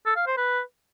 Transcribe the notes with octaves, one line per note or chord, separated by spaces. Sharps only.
A4
F5
C5
B4